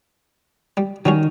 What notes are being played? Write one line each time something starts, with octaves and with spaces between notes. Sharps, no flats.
G3
D#3 F#3 G3 C#4